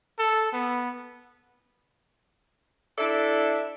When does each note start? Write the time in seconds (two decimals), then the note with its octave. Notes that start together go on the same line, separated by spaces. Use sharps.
0.19 A4
0.53 B3
2.98 D4 E4 A4 D5 E5